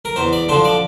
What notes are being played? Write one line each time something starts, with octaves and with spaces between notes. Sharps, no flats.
A#4
E2 C5
D5
D3 F3 C5
D5